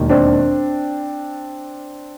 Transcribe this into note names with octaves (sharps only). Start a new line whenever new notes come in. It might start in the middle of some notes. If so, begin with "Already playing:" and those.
Already playing: E1 D#2 D#3
C4 D4